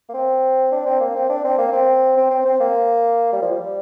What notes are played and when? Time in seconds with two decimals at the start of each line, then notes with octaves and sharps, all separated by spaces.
0.09 A#3
0.14 C4
0.72 D4
0.86 C4
1.00 A#3
1.15 C4
1.29 D4
1.44 C4
1.58 A#3
1.73 C4
2.17 C4
2.30 C4
2.45 C4
2.60 A#3
3.33 G3
3.42 F3
3.52 G3